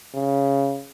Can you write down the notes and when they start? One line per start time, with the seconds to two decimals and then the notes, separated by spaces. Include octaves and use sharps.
0.15 C#3